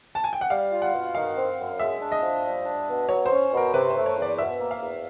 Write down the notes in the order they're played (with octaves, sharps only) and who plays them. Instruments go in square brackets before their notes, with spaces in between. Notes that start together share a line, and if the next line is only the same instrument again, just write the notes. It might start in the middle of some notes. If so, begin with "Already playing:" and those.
[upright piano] A5
G#5
G5
F#5
[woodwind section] G3 [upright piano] F5
[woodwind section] F4
[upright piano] F#5
[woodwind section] B2
[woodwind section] D#3 [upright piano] F5
[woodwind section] C4
F#2
[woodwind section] G#3 [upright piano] E5
[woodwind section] D4
[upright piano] D#5
[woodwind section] F3
G3
D4
B2
[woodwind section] F#3 [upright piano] C#5
[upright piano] C5
[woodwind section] C#4
[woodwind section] B2 [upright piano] A#4
[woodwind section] C3 [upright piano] B4
[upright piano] C5
[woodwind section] A3
[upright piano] C#5
[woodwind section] E2
[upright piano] D5
[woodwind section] B2 [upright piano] E5
[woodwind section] A#3
[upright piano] F5
[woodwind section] E2